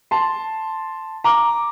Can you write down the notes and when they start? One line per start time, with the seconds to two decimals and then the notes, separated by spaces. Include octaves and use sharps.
0.11 A5 C6
1.24 A#5 D6